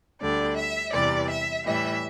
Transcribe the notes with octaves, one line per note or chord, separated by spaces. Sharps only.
D2 D3 G3 D5
E5
E2 C3 E3 G3 D5
E5
A2 E3 G3 E5